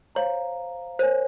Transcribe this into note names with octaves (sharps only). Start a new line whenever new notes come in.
C5 C#5 F5 A#5
A#4 C5 C#5 G#5